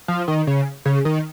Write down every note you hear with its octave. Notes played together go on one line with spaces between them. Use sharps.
F3
D#3
C#3
C#3
D#3